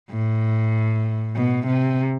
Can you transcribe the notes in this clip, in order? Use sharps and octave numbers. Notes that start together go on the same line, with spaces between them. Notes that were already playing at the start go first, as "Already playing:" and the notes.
A2
B2
C3